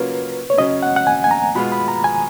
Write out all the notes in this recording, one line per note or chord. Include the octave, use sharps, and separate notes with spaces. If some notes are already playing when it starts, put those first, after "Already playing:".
Already playing: C#3 F#3 A#3 C#4 F4 B4
C#5
C#3 F#3 C#4 D#5
F#5
F#5
G#5
G#5
A#5
B2 G#3 B3 F4 B5
B5
A#5
G#5